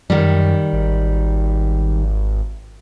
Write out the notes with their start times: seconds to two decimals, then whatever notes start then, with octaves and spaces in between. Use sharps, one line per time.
0.10 F#2 D#3 G3
0.73 G#1